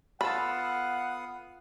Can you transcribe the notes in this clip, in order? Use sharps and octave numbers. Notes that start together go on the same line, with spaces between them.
B3 F4 A4 F5 F#5 B5 D#6